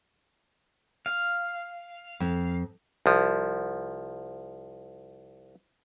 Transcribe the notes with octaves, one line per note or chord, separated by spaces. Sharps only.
F5
F2
C2 F3